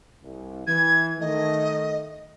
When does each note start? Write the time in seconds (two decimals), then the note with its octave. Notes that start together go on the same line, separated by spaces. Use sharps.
0.22 C2
0.67 E3 G#6
1.20 D#3 A3 D#5